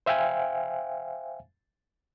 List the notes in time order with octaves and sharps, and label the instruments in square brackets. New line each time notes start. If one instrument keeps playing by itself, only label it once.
[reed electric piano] C5 E5 F5 G5 G#5